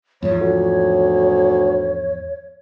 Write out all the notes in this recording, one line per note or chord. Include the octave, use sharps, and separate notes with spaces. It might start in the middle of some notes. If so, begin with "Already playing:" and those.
E2 G#2 F3 C#5
D2